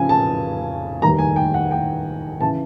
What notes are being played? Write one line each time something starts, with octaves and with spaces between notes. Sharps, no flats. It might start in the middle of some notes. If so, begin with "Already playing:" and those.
Already playing: F1 F2 C#3 G#5
A5
F1 D#2 D#3 G3 A#5
G#5
G5
F#5
G5
C#3 E3 A5